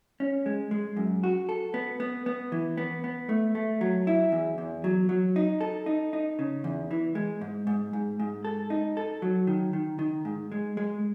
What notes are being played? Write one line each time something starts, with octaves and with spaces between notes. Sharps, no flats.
C#4
G#3
G#3
F#2
F#4
A4
B3
B3
B3
E3
B3
B3
A3
A3
F#3
E4
E2
E2
F#3
F#3
D#4
A4
D#4
D#4
C#3
E2
E3
G#3
G#2
G#2
G#2
G#2
A4
D#4
A4
F#3
D#3
D#3
D#3
G#2
G#3
G#3